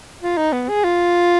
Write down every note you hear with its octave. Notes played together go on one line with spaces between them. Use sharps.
F4
D#4
B3
G#4
F4